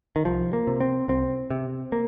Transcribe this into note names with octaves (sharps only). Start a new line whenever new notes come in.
D#3
C2 F3
A#3
C3
C4
C2 C4
C3
A#3